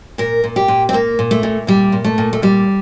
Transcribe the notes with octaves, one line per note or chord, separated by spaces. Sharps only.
A#2 A#4
A#2
G4
A#2
C4
A#2 A#3
A#2
A3
A#2
A#2 G3
A#2
A3
A#2
A3
A#2 G3